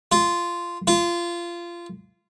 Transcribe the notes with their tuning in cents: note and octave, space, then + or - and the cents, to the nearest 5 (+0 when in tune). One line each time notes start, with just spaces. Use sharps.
F4 -10
F4 -20